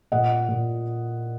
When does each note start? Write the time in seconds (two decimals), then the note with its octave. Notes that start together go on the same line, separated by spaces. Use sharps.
0.12 A#2 D#5 F#5
0.49 A#2